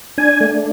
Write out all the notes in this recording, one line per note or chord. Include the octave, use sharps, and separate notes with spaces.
D4 G#5
A3